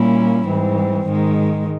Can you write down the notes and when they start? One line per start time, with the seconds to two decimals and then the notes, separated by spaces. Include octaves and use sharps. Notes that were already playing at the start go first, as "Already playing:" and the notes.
Already playing: A#2 G3 A#3 C#4 E4
0.46 G#2 E3 G3 C4
1.06 G#2 D#3 G#3